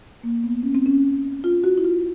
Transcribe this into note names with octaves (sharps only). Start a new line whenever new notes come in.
A#3
B3
C#4
C4
C#4
F4
F#4
E4
F4